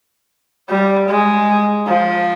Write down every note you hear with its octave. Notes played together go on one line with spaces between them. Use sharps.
G3
G#3
F3